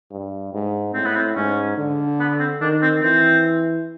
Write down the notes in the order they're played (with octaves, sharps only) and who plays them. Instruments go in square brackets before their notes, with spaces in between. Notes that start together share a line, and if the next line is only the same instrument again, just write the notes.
[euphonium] G2
G#2
[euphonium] A2 [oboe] C4
[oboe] B3
C4
[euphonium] G#2 [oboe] C#4
[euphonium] D3
[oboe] B3
C4
[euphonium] D#3 [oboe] D4
[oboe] C4
[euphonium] E3 [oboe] C4